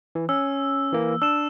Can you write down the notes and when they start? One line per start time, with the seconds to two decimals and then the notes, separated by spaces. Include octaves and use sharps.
0.15 E3
0.29 C#4 E6
0.92 E3 A#3
1.22 D4 E6 E7